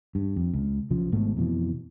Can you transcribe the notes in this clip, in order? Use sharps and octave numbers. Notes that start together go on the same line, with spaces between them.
G2
F2
C#2
B1 C#3 F3
G#1 G#2 B2 A3
F2 B2 E3